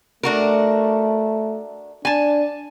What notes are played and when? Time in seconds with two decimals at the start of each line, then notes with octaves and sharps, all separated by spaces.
0.23 A3 D4 F#4 A#4
2.05 D4 G#5 A5